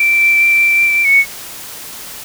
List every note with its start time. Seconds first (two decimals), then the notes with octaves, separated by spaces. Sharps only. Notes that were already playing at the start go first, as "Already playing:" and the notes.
Already playing: D7
1.05 C#7